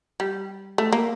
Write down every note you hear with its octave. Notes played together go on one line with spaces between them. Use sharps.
G3
A3
A#3